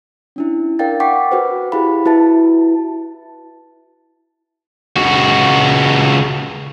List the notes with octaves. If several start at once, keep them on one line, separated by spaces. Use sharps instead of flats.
C#4 D4 E4
A#4 D5 F5 G5 A6
F#5 G5 C#6 D6 B6
F#4 B4 C5
E4 G4 G#4 F5 B5
E4 F#4 B4 E5 A5 A6
C#2 F#4